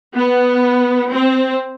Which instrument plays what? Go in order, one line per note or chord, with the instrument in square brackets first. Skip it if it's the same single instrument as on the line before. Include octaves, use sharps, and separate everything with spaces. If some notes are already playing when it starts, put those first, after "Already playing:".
[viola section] B3
C4